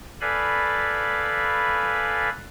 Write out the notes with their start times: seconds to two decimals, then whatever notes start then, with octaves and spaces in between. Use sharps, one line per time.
0.21 A4 B4 D5 F5 G#5 B5